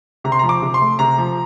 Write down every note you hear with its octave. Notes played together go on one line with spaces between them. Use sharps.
C3 A#5
C6
F3 A#5
D6
C3
C6
A3
C3 A#5
F3